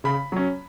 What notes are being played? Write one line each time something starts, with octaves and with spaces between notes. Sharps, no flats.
C#3 B5
F#3 C#4